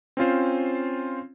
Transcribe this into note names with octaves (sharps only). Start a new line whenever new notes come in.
C4 C#4 F4 C5